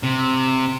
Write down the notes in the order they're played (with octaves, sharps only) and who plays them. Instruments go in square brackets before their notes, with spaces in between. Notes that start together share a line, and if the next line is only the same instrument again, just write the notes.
[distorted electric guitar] C3